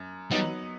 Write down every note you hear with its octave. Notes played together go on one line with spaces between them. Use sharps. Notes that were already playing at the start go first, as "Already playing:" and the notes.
Already playing: F#2
F#3 G3 B3 D#4